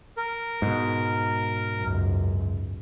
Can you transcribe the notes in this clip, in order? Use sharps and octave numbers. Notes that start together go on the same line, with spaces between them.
A#4
G#2 B2
C#2 F#2